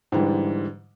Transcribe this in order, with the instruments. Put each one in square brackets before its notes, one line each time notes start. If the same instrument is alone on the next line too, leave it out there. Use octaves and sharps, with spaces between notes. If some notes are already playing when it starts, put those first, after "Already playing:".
[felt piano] G#2 D3 E3 G3